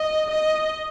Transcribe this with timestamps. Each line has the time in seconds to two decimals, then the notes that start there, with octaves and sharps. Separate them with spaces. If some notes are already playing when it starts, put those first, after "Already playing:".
Already playing: D#5
0.30 D#5